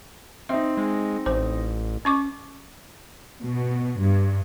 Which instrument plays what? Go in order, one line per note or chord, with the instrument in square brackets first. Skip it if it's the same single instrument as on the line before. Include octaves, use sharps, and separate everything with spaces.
[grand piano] C4 D#4 [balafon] E5
[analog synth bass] G#3
[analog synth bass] A1 [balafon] C5
[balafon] C#4 C#6 D6
[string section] B2
G2